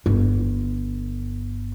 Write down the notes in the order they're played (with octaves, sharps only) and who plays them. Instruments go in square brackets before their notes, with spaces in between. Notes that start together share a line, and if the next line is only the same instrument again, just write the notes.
[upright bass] G1 D3